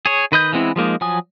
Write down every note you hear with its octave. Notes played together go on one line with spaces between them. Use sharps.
G#4 C#5
D#3 B4 D#5 G6
E3 G#3 B3 C4 E4
F3 G#3 A#3 D#4
F3 F#3 G#5 D#6